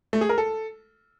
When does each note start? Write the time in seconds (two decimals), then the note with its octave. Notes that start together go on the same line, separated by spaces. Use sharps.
0.13 A3
0.21 G#4
0.29 A#4
0.38 A4